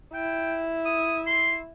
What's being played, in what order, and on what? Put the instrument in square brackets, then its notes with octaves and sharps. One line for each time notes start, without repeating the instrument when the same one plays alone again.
[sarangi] E4 [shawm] G5
[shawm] D#6
C6